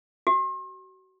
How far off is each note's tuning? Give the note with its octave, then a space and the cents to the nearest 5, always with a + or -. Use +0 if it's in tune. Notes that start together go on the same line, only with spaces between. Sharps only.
F#4 +35